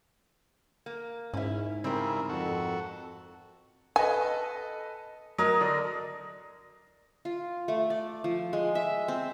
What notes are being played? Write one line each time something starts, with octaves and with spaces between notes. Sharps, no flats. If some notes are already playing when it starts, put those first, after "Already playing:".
A#3
G#2 C#4 E4
C#3 G3 C4 E4 A#4
F2 F#4 A4
A4 B4 D#5 G#5
F#3 A#4 D#5
D3 D5
F4
A3
D5
F3
G#3
E5
C4